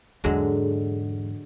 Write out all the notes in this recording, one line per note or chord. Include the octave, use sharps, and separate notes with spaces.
E2 G#2 D3 F#3 G#3